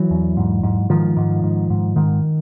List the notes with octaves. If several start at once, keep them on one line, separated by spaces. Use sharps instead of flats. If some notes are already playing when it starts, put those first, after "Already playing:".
Already playing: E3 F#3
E2
G#2
G#2
G#2 D#3 F3
G#2
G#2
G#2
G#2 D#3